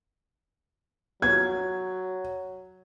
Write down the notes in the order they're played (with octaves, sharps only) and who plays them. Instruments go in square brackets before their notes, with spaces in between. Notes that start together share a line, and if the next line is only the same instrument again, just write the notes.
[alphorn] F#3 [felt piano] G#6